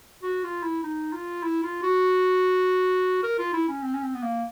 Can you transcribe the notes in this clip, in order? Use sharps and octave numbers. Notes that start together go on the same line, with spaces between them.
F#4
F4
E4
D#4
F4
E4
F4
F#4
A#4
F4
E4
C#4
C4
C#4
C4
B3
A#3